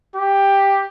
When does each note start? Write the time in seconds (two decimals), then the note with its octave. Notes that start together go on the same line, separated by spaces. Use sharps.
0.16 G4